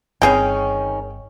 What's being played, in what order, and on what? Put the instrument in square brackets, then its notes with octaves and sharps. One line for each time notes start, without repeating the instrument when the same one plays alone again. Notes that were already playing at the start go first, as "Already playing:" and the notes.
[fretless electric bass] G1 C4 [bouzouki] D#3 C#4 [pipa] G#4 G5